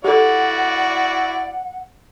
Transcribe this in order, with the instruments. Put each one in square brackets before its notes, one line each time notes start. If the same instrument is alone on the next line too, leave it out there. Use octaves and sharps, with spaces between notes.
[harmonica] E4 F#4 D5 [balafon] G4 A4 [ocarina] F#5